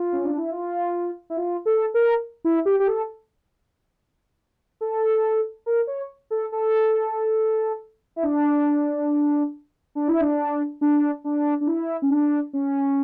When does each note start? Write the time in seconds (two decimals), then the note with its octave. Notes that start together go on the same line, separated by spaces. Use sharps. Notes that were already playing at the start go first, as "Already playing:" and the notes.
Already playing: F4
0.12 C#4
0.25 D4
0.37 E4
0.51 F4
1.30 E4
1.37 F4
1.65 A4
1.94 A#4
2.45 E4
2.65 G4
2.80 G4
2.87 A4
4.81 A4
5.66 A#4
5.87 C#5
6.30 A4
6.52 A4
8.16 E4
8.23 D4
9.95 D4
10.08 E4
10.20 D4
10.81 D4
11.24 D4
11.61 D4
11.67 E4
12.02 C#4
12.10 D4
12.53 C#4